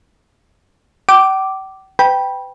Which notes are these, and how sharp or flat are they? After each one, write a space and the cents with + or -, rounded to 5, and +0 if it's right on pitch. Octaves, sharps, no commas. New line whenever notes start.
G5 -40 D6 +0
B4 +35 G5 +0 B5 -25